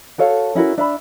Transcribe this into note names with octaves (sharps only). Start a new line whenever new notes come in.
F#4 A4 C#5 F5
C#4 E4 F#4 A#4
D4 E5 B5